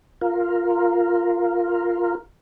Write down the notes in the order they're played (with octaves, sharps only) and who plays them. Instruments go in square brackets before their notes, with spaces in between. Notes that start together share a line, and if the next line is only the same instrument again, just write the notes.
[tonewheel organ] F4 A#4